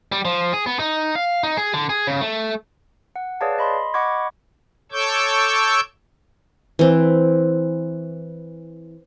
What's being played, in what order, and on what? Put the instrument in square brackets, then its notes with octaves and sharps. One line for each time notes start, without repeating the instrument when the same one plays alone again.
[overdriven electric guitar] G3
F3
G#4
B3
D#4
F5
D#4
G#4
D3
G#4
C#3
A3
[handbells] F#5
G#4 B4 C#5 D5 F5 A5
D#5 B5 C6
D#5 F#5 B5 C#6 D6 G#6
[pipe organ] A4 C#5 C#6 D6 E6 G6
[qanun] E3 C4